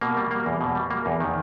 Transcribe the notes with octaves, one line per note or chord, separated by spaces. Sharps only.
B2 A#3
G3
A#3
E2
B2
G3
A#3
E2
D#3